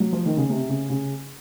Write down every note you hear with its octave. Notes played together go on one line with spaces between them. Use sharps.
F#3
F3
D#3
C#3
C3
C#3
C#3